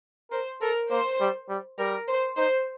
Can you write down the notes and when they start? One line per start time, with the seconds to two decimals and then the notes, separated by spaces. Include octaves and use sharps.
0.31 A#4 C5
0.61 A4 A#4
0.90 A#3 C5
1.20 G3
1.49 G3
1.78 G3 A#4
2.08 C5
2.37 D#4 C5